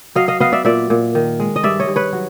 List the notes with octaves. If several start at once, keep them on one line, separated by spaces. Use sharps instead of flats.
F#3 D#5 F5
D#5 F5
B3 D#5 F5
D5 E5
A#2 D5 E5
A#2
D#3
G#3
D#5
G2 D5 E5
C#5 D#5
G2
B4 C#5
F#3